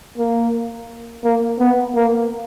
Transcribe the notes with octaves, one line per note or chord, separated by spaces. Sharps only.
A#3
A#3
B3
A#3